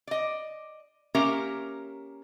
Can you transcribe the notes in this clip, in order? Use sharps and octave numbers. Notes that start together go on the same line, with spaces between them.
D5 D#5
A#3 C#4 G4 A#4 E5